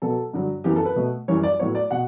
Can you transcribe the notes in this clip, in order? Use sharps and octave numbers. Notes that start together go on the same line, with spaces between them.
B2 F#3 B3 A4
G2 D3 F#3
F#2 E3 B3 G4
A4
B4
B2 A3
F#2 E3 G3 C#5
D5
A2 F#3 B3 C#5
D5
B2 F#5